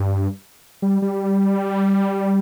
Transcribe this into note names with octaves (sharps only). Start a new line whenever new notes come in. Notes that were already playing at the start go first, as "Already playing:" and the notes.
Already playing: G2
G3
G3